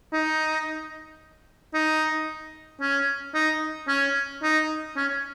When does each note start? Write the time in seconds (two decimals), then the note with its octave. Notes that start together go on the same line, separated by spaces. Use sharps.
0.13 D#4
1.74 D#4
2.81 C#4
3.34 D#4
3.88 C#4
4.43 D#4
4.97 C#4